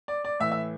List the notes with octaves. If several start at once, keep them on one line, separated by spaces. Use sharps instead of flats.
D5
D5
A2 E3 E5
E5